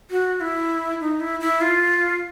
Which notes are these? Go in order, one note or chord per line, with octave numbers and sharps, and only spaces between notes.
F#4
E4
D#4
E4
E4
F4